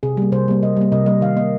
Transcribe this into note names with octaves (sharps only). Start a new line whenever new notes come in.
C3 G#4
G3 A#3
C3 C5
G3 A#3
C3 D#5
G3 A#3
C3 D#5
G3 A#3 D#5
D#3 F5
A#3 D#5